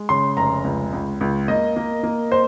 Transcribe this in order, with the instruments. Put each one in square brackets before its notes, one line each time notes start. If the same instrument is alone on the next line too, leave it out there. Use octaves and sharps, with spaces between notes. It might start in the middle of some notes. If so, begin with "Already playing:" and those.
Already playing: [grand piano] G#3
C#3 C6
F1 A#5
C#2
C#2
C#2
A#3 D#5
A#3
A#3
C5